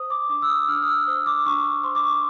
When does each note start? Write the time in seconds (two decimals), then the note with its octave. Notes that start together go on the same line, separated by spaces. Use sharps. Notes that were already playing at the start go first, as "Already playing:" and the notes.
Already playing: C5 D#6
0.10 D6
0.29 D4 D6
0.42 E6
0.50 D#6
0.68 D4 F6
0.83 D#6
0.88 E6
1.07 C5 D#6
1.26 D6
1.46 D4 C#6
1.65 C#6
1.84 C5 C6
1.95 D6
2.04 C#6